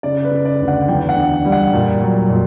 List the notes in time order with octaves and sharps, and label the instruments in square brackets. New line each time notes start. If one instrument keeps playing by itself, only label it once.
[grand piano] C#3 D5
B4
C#3
D5
D2
F#5
E2 G5
F#5
D3
G3
F#5
A#2
F#3
A#2